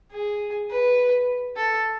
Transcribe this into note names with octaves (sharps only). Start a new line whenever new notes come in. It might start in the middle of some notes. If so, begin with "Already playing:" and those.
G#4
B4
A4